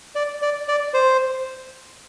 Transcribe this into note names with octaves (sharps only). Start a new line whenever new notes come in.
D5
D5
D5
C5